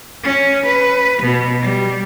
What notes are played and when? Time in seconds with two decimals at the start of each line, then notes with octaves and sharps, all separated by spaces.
0.22 C#4
0.65 B4
1.22 B2
1.60 G3